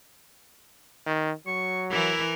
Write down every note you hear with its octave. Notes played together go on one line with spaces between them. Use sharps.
D#3
F#3 C#6
E3 E4 A#4